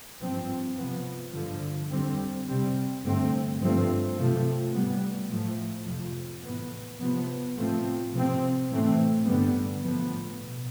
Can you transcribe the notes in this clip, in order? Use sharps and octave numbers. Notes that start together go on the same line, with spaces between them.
G2 F3 C4
C3 F3 B3
G2 D3 F3
F2 D3 G3 C4
C3 G3 C4
G2 D3 A3 C4
G2 F3 A3 C4
C3 F3 A3 C4
A2 G3 B3
A2 F3 A3
F2 C3 F3
A2 E3 B3
C3 F3 B3
A2 F3 A3 C4
C3 F3 C4
A2 E3 A3 C4
G2 D3 G3 B3
A2 F3 B3
B2